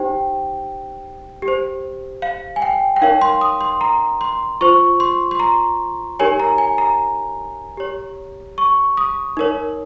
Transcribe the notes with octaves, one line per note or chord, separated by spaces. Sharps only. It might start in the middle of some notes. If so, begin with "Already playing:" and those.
Already playing: D#4 G4 C5 G5
G4
C5
F5
G#5
G5
G5
D#4 A#4 C#5 F5
C6
D#6
C6
A#5
C6
F4 C5 C#6
C6
C6
A#5
D#4 G4 A#4 C#5 G#5
A#5
G#5
A#5
G4 C#5
C#6
D#6
D#4 A#4 C#5